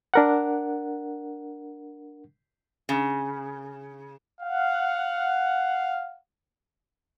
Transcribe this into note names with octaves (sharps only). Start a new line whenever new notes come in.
D4 A#4 F#5
C#3
F5 F#5